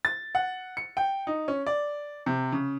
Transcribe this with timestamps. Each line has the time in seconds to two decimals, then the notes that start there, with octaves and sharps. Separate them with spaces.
0.05 A6
0.35 F#5
0.77 C#7
0.97 G5
1.27 D#4
1.48 C#4
1.67 D5
2.26 C3
2.52 C#3